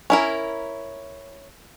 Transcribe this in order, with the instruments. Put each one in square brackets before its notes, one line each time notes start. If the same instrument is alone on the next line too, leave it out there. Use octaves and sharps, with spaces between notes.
[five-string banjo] C#4 E4 A#4